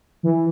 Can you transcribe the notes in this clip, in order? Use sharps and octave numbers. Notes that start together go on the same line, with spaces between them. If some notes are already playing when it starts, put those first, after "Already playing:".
E3